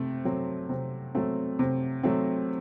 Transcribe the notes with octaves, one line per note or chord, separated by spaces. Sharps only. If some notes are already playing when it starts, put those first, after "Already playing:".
Already playing: C3 A3 C4
F#3 A3 C4
C3
F#3 A3 C4
C3
F#3 A3 C4